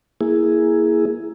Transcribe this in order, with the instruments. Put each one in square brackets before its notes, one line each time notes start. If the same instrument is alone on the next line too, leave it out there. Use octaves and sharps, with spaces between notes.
[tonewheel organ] A#3 E4 G#4